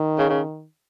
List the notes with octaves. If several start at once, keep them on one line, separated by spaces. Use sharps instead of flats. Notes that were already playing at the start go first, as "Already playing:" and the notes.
Already playing: D#3
C#3
C#3